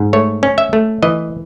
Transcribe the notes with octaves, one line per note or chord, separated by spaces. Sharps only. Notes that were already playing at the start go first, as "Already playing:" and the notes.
Already playing: G#2
A3 C#5
C#4
E5
A3
E3 D#5